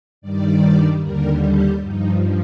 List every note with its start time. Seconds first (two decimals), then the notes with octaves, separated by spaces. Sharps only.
0.21 G2 D#3 G3 D5
1.00 D#2 D3 G3 A#4
1.40 G4
1.80 G2 F3 D#4